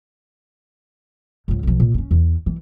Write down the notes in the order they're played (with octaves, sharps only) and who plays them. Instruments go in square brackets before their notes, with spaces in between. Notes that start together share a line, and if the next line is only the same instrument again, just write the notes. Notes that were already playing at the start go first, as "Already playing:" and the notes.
[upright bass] C#2 G#2
B1 F3
A#2
C#4 D4
E2
E3